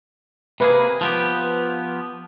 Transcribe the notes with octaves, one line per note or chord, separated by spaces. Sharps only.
C3 A#3 G#4 B4
F3 B3 G4